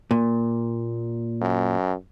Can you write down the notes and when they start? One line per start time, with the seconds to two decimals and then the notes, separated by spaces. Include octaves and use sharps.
0.11 A#2
1.42 F#2